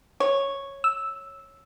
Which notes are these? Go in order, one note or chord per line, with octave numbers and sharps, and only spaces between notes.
C#5
E6